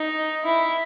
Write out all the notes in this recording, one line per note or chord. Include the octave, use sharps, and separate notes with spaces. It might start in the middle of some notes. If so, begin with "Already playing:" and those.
Already playing: D#4
E4